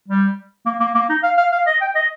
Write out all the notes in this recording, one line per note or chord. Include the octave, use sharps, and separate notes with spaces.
G3
A#3
A#3
A#3
D#4
F5
F5
F5
D#5
G5
D#5